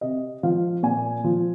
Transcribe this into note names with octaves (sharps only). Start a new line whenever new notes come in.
C3 D#5
F3 F5
A#2 G#5
F3